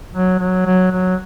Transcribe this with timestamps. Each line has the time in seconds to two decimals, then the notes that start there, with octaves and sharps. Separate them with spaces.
0.13 F#3
0.39 F#3
0.66 F#3
0.92 F#3